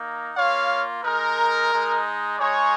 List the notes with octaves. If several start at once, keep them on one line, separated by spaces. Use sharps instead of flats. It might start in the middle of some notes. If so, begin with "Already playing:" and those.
Already playing: A#3 D#4
A#3 F4 C#5 F5
G#3 D#4 A#4
G#3 D#4
G#3 D#4 G#4 C#5